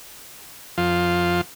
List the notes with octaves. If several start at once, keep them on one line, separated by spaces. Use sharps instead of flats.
F2 F3 F4